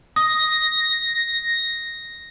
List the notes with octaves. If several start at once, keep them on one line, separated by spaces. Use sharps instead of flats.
D#6 A#6